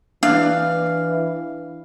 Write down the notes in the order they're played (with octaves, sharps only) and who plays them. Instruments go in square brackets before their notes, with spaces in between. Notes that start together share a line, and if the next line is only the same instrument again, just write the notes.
[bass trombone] E3 [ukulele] D4 [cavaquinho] F5